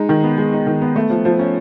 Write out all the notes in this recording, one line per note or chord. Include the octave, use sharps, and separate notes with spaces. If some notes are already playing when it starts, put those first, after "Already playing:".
Already playing: G#3 D#4
D#3
B3
G#3
D#4
D#3
B3
A3
F3
F3
C#4